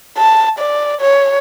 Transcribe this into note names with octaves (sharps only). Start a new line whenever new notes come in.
A5
D5
C#5